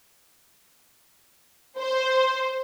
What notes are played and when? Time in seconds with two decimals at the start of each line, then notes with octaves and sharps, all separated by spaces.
1.79 C5